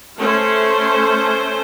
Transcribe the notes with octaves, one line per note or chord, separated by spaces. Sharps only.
A3 C#4 C5